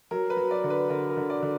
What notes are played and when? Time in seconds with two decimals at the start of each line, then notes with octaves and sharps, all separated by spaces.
0.11 F#3 A#4
0.30 B4
0.36 F#3
0.51 D5
0.64 D3
0.70 B4
0.90 D3 A#4
1.10 A#4
1.17 D3
1.30 D5
1.43 D3